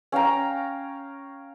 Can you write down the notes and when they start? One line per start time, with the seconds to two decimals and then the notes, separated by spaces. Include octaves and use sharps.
0.12 C#4 F5 G5 A#5